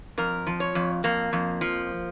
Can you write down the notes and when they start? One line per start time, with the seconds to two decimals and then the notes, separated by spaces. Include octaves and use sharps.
0.18 F2 A#4
0.47 F3
0.60 C#5
0.75 F2
1.04 F2 A#3
1.33 F2
1.61 F3